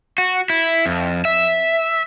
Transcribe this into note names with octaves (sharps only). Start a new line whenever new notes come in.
F#4
E4
F2
E5